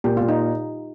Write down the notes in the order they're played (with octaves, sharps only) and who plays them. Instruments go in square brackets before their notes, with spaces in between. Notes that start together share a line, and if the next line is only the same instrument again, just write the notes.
[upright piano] A#2 [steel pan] G4
[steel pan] F4
[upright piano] A#2
[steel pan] D#4